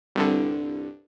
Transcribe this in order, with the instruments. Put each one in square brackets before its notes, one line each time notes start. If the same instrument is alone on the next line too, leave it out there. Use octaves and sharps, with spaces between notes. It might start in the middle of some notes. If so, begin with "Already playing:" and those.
[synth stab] C2 G2 D3